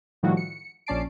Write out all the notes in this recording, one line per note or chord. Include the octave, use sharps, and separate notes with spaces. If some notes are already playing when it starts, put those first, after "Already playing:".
A2 D#3 F3 G3 E4 F#4
C#7
A#1 C#4 D5 A5 C7 D7